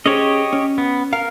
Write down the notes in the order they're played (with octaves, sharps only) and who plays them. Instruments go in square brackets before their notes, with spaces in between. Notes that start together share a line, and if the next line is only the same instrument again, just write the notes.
[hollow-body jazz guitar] C#4 G#4 C5 [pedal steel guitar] G4 C#5 D#5
[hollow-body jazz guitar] C#4
[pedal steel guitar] B3
[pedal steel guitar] A#4 [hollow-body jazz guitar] F5